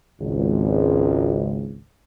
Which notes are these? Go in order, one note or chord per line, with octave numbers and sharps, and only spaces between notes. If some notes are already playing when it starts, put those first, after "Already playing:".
G#1 C#2